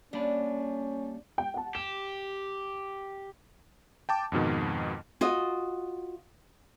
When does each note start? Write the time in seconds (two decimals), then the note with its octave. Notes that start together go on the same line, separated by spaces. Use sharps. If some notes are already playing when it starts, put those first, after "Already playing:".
0.13 G3 A#3 C#4 D4 B5
1.38 G5
1.54 F#5 A5
1.75 G4 E7
4.09 G5 A5 D6
4.32 F2 G#2 B2 D#3
5.21 F4 F#4 D#5